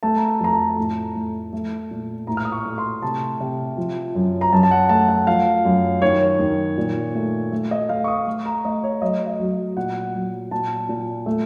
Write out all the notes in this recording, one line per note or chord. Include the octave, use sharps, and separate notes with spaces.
A3 A5
A#5
A5
F2 A#5
A5
A2
A3
A3
A#2
A2 A#5
F6
D#6
C#6
A3
C6
C3 A5
C3
F3
F#2
A#5
F#2 A5
A5
F#5
A3 A5
F#5
F3 F5
F#2
D#3 C#5
D#3
A#2
A3
A3
D#5
A3 F5
C#6
D#6
A3
A#5
A3 D#5
C#5
F#3 D#5
D#5
F#3
A#2 F#5
F#3
A#2 A5
A#2
A3